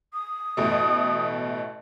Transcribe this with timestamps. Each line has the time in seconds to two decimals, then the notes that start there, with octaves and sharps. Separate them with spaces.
0.14 D#6
0.57 A1 B2 A3